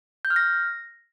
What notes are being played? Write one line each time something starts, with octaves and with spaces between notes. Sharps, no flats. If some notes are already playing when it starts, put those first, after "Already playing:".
G6
F6
A#6